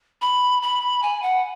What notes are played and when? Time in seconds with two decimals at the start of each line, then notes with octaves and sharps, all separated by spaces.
0.22 B5
0.62 B5
1.02 G#5
1.23 F#5